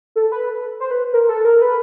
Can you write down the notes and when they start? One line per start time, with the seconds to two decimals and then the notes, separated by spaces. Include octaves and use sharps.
0.16 A4
0.32 B4
0.80 C5
0.91 B4
1.13 A#4
1.29 A4
1.45 A#4
1.62 B4